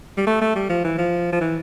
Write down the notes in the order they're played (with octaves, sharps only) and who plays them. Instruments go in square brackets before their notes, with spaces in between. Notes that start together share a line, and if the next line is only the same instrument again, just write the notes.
[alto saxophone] G3
A3
A3
G3
F3
E3
F3
F3
E3